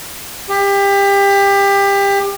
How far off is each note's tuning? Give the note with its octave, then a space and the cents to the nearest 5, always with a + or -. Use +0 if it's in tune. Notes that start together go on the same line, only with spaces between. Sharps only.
G4 +25